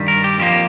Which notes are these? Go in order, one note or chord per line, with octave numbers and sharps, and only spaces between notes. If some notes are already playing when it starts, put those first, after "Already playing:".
Already playing: G2 D#3 G3
A#4
G4
F2 F3 A#3 G4